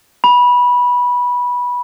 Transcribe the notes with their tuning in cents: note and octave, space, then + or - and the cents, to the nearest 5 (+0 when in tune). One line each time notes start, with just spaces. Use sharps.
B5 -15